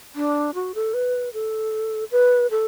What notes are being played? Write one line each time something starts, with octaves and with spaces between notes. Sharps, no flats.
D4
F#4
A4
B4
A4
B4
A4